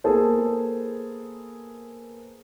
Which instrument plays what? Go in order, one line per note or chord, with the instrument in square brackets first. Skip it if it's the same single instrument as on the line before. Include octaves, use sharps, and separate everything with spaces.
[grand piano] A#3 B3 G#4 A4 C5